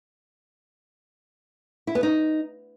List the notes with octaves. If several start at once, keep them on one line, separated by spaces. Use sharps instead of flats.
E4
B3
D#4